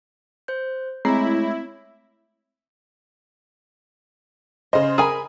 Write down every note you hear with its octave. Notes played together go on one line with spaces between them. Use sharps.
C5 G6
G#3 A3 C4 E4 C#5 A#6
C#3 C5 D#5
G#4 A#4 G#5 B5